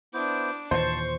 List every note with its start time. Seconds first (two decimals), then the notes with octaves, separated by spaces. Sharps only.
0.14 B3 D4 E4 C5 D6
0.71 D#2 A#2 E3 C5 A5 C6 C#6